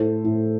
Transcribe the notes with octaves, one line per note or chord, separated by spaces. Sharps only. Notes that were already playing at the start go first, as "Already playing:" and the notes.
Already playing: A2 A4 C5
A2